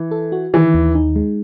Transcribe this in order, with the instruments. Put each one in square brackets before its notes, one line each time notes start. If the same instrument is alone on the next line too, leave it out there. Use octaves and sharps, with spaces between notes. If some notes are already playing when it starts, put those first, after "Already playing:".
Already playing: [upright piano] E3
[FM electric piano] A4
F#4
[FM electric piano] D#3 [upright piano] E3
[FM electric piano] D#2
D#4
G#3